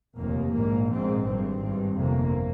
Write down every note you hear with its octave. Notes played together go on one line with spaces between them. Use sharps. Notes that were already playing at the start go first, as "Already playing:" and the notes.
F1 D#2 A#3
A#1 G#2 A#3
A#1 G#2 C4
G#1 G2 C4
G#1 G2
G1 F2 C3 A#3